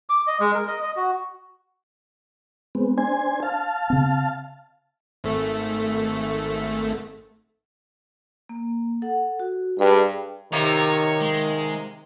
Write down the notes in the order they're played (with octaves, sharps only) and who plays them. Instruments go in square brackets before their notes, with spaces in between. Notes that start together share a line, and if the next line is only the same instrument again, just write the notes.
[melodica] D6
D#5
G#3
A#4
D#5
D#5
F#4
[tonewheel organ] G#3 B3 C4
D4 C5 G#5
F5 A5
[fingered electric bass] C#3 C4
[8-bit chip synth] G#1 A3
[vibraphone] A#3
A4 F#5
F#4
[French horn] G2 [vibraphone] G#4 G5
[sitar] C3 A#3 D#4 [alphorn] D#3 [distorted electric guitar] C#5
[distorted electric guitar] G#3